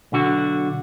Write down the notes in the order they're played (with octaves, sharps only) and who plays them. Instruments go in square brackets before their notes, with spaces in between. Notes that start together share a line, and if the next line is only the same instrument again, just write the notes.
[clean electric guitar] B1 D3 F#4